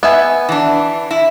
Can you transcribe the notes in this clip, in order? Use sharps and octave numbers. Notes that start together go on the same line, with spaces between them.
B3 E5 G#5
E3 D4
E4